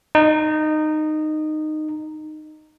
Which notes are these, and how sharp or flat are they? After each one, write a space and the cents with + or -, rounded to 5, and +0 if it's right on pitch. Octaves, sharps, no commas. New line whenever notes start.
D#4 -15